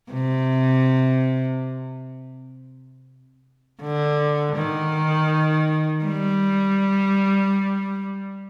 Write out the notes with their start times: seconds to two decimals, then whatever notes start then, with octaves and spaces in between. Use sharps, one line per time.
0.12 C3
3.82 D3
4.56 D#3
6.04 G3